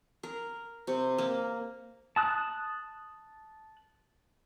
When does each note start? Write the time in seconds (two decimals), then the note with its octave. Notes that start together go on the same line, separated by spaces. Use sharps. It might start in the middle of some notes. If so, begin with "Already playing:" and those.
0.23 A#4
0.87 C3
1.18 A#3
2.16 A5 D#6 F#6